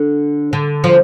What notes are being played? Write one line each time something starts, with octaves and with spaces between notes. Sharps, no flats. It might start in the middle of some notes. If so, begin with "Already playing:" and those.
Already playing: D3
D3
F3